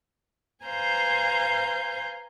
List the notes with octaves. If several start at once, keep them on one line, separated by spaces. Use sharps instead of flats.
B4 C5 F5 G#5 A#5 G6